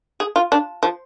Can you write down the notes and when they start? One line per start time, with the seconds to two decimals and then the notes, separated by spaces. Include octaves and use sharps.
0.20 G#4
0.36 F4
0.52 D4
0.83 F3